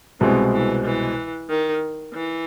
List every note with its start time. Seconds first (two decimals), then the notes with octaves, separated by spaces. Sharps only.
0.20 C2 B2 E3 G#3 C4
0.52 E3
0.84 E3
1.49 D#3
2.14 E3